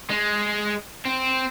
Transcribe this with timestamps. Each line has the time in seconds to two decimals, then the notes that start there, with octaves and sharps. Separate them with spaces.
0.11 G#3
1.05 C4